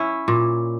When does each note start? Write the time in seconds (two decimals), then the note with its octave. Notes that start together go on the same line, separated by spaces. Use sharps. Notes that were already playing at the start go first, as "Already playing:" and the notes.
Already playing: C#4 E4
0.28 A#2